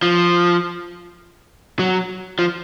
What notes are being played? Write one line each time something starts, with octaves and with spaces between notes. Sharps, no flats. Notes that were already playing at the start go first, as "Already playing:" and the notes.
F3
F#3
F3